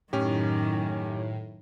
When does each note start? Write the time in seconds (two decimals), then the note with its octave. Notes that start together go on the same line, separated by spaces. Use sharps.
0.13 F#2 A2 D#3 C#4 G4